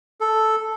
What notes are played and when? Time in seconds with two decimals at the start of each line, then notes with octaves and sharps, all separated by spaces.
0.21 A4